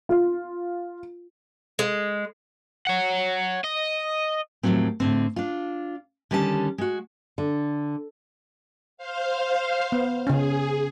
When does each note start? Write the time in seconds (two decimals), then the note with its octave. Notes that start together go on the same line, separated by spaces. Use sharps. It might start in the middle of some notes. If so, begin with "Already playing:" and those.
0.09 F4
1.79 G#3
2.87 C#5 F#5
3.64 D#5
4.63 D#2 A2 D#3 F3 F#3 C4
5.00 A2 D3 C4
5.36 D4 F4
6.31 D3 D#3 G3 C#4 F#4 A5
6.78 G#3 F#4
7.38 D3
8.97 C5 F5
9.92 B3
10.27 C#3 C#4 G#4